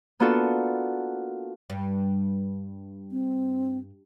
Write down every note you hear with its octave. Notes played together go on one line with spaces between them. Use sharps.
A#3 B3 D4 F4 F#4 A4
G2
C4